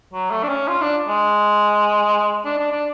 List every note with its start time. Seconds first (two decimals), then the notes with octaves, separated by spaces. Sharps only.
0.13 F#3
0.31 A3
0.43 D4
0.49 C#4
0.68 F4
0.81 D4
1.08 G#3
2.45 D4
2.58 D4
2.72 D4